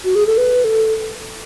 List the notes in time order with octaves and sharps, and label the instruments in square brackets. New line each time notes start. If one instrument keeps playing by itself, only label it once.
[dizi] F#4
G#4
A4
B4
A4